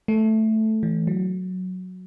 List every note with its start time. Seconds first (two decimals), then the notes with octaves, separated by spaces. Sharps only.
0.08 A3
0.83 E3
1.07 F#3